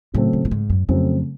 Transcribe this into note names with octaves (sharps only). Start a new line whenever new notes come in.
A2 C#3 F#3 A3 C4
A2
A2
G#2
F#2
F2 C#3 F#3 A3 C4